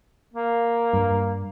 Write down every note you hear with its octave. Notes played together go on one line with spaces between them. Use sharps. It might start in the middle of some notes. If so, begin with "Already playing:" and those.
A#3
G2